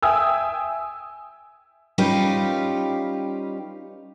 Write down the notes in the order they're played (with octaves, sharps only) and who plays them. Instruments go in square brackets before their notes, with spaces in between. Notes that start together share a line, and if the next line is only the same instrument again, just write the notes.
[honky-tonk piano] E5 G5 G#5 D#6 E6
[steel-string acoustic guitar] G3 C#4 D#4 F4 G4 B4